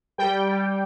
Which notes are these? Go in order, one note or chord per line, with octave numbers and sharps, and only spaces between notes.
G3 G5
G3